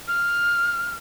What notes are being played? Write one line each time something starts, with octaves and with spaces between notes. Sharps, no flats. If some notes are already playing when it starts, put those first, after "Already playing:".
F6